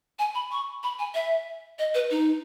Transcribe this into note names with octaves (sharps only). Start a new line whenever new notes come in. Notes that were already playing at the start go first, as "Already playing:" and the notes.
G#5
B5
C#6
B5
G#5
E5
D#5
B4
D#4